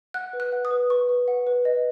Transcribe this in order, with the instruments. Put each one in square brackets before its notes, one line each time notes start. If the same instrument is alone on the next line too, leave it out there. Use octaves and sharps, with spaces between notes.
[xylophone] F#5 F#6
B4
F#6
F#5
D#6
B4
B4 C#6
B4
F#5
B4
D#5